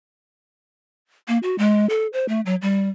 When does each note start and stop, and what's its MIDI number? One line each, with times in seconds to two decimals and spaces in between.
1.28 1.38 58
1.43 1.56 66
1.58 1.88 56
1.89 2.07 69
2.13 2.26 72
2.29 2.41 57
2.46 2.56 54
2.62 2.89 55